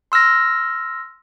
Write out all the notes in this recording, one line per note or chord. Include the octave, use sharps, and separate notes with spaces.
C6 E6 F6 A#6